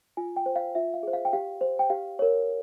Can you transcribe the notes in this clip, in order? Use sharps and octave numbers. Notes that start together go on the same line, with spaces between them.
F4 G#5
G5
C5
F5
F4 E5
F5
G#4 C5
F5
G5
G4 F5
C5
G5
G4 F5
A#4 C#5